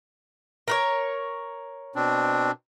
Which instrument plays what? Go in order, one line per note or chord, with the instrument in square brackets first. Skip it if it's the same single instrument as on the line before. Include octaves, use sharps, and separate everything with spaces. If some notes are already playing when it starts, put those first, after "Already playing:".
[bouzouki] A#4 B4 C#5
[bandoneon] B2 C4 D4